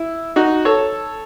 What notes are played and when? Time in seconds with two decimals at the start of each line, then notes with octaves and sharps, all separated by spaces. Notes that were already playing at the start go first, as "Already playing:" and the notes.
Already playing: E4
0.36 D#4 F#4
0.65 A4 C#5